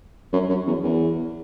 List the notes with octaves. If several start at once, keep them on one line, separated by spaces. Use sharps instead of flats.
F#2
F#2
E2
E2